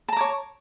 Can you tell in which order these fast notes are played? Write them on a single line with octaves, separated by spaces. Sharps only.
A5 A#5 D6 C#5